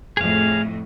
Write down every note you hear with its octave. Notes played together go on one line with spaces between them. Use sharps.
F2 A2 G#4 F5